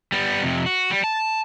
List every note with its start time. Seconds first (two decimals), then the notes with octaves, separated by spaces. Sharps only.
0.12 G3 B3
0.43 F2 C3
0.66 F#4
0.91 G3
1.04 A5